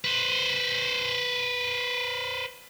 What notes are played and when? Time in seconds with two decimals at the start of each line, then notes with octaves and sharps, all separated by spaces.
0.04 B4 C5